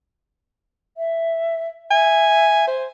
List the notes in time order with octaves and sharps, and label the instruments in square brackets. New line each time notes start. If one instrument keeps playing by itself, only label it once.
[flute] E5
[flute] E5 [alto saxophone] G#5
[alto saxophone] C5